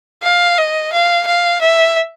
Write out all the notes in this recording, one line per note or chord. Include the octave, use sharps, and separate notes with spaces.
F5
D#5
F5
F5
E5